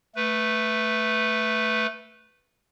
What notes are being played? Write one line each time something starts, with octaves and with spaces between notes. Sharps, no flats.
A3 B4